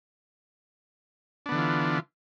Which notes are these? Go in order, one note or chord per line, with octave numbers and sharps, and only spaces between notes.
D3 E3 B3 D4 F4